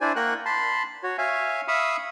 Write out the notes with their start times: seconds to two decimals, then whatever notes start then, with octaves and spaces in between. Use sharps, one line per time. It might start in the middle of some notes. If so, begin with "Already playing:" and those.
0.01 D4 E4 C5 D5 G#5
0.16 A#3 A#4 F#5 G5 C#6 F#6
0.45 A5 B5 C6
1.03 F#4 C#5
1.18 C#5 E5 F5 G#5
1.68 E5 F5 B5 C#6 D#6 E6